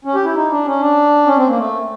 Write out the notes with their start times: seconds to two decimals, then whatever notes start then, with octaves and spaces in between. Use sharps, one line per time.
0.05 C#4
0.15 G4
0.25 E4
0.35 D#4
0.50 D4
0.65 C#4
0.80 D4
1.26 C#4
1.37 C4
1.47 A#3
1.57 A3